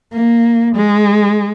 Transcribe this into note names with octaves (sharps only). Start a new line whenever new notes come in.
A#3
G#3